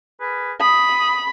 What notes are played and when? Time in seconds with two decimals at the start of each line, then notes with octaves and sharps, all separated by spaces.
0.21 G#4 A#4 B4
0.61 B5 D#6